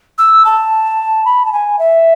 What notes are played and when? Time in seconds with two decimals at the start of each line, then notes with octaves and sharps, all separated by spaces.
0.18 E6
0.45 A5
1.25 B5
1.46 A5
1.52 G#5
1.79 E5